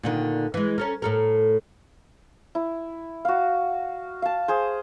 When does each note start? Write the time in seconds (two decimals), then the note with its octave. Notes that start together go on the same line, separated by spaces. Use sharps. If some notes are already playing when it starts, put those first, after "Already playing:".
0.03 A#2 D3 D#3
0.54 E3 G#3
0.78 C#4 A4 A#4
1.02 A2 A4 A#4
2.55 E4
3.25 F#4 F5
4.22 F5 A5
4.48 G#4 C5